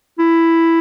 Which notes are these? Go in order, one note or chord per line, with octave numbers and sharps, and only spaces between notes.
E4